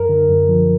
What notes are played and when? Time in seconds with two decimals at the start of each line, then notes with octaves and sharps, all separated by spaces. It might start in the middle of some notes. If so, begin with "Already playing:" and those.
Already playing: F#2 A#4
0.09 D3
0.30 F#2
0.49 F3